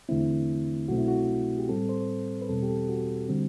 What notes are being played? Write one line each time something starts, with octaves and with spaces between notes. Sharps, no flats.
E2 D3 A3 C4 E4
C2 B2 F#3 A3 C4 F#4
E4
F#4
G4
A2 G3 C4 A4
C5
B4
E2 B2 G3 C4 A4
G4
A4
F#4
D3 G3 C4